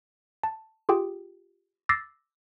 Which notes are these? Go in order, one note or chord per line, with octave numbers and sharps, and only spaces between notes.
A5
F4 G4 G#4 G5
D6 E6 A6 A#6 C7